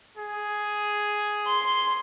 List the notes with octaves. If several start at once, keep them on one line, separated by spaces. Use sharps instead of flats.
G#4
C6